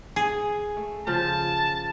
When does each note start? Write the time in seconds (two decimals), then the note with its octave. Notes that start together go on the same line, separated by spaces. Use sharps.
0.16 G#4 G#5
0.77 A3
1.07 C#3 F3 F4 A5